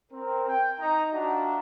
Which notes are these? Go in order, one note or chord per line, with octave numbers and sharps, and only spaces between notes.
C4 A#4
G5
D#4 A#5
D4 F4 F#4 E5 F#5 A#5